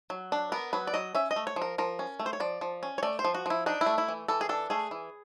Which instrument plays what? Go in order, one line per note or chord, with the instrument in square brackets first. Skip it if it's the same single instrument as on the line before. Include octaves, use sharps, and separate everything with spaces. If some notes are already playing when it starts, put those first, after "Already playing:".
[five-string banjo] F#3
D4
B3 A#4
F#3 B4
D5
F#3 D#5
C#4 E5
D#5
A3
C#5
F3
A#4
F3 A#4
C#4
A3
C5
C#5
F3 D5
F3
C#4
C#5
A3 D5
C5
F3
F#4
F3 E4
D4 D#4
E4
A3
E4
E3
E3 A4
G#4
D4 A4
A3 G#4
E3